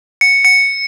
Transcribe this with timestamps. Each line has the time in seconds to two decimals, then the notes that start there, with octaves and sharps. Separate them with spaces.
0.21 C#7
0.45 C#7